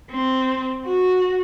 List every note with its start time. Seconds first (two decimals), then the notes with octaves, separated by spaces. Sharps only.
0.12 C4
0.86 F#4